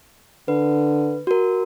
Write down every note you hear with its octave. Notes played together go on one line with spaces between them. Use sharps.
D3 B4
F#4 A#4